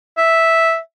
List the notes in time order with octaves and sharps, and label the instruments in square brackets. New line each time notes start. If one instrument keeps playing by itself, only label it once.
[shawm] E5